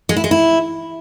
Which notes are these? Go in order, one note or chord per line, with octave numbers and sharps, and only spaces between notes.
G#3
E4
G#3
E4